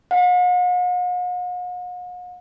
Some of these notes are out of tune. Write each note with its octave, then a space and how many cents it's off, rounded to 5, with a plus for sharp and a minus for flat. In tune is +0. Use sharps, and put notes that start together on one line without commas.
F#5 -45